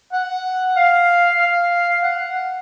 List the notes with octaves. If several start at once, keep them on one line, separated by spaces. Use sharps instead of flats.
F#5
F5
F5
F#5